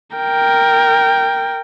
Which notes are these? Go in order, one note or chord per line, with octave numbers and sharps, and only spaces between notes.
A#4 G5